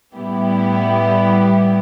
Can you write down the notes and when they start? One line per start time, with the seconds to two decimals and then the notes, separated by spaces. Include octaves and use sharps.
0.17 A2 G3 B3 E4 G4